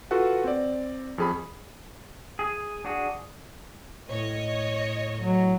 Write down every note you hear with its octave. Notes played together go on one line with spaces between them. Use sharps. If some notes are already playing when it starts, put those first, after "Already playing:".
F4 F#4 A4 B4 F#5
C4 D5
F2 G#4 B5
G#4
D4 F#4 G#4
A2 C#5 D#5
F#3